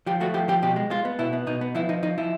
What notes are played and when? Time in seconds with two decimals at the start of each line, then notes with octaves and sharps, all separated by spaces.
0.06 F3 G4
0.20 A3 F#4
0.34 F3 G4
0.48 F3 G4
0.62 B2 G4
0.76 G#3
0.90 G#3 F4
1.05 B3
1.19 B2 E4
1.33 B3
1.47 B2 D#4
1.61 B3
1.75 F3 E4
1.89 F3 D#4
2.03 F3 D#4
2.18 F3 E4